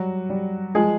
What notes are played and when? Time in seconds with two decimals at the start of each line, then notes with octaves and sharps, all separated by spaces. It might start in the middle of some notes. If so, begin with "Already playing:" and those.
Already playing: F#3 G3 F#4
0.30 G3
0.75 F3 G#3 G#4